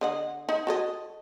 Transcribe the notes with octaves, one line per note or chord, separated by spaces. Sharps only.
D3 D#5 F#5
D#4
F#4 A4 D#5